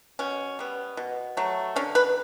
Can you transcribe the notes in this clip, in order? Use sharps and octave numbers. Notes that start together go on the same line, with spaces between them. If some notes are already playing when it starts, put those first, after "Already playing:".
B2 C#4
G3 B3
B2
F#3 A3
D3 C#4
B4